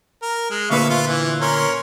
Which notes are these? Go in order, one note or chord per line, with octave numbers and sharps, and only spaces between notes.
A#4
G#3
D2 A#2 B4 E5 F5 C#6
F4
E3
C#4 A#4 C6